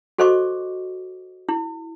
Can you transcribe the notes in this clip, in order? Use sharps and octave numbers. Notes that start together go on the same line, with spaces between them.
F#4 A4 C5 D#5 C#6 D6
E4